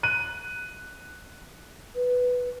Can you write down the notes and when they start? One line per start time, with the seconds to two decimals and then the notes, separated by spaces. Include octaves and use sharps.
0.03 F#6 D#7
1.95 B4